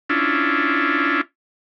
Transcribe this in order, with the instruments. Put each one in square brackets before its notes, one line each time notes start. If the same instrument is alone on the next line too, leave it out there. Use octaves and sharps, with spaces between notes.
[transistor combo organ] C#4 D4 E4 F4